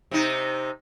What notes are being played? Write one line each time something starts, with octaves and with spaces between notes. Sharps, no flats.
C3 D#4